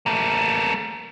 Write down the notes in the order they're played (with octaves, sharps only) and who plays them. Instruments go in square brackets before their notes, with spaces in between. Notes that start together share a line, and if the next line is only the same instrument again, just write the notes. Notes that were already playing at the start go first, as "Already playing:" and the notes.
[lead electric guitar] A3 A#3